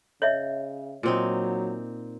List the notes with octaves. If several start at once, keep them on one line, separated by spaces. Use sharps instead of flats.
C#3 C#5 D#5 E5
A#2 F#3 C4 D#4